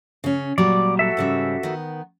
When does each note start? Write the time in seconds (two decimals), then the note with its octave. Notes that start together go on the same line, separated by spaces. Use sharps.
0.24 C#3 C#4
0.58 A#2 F#3 G3 D5
0.99 F#4 A4 E5
1.17 G#2 C#3 G3
1.63 D#3 B3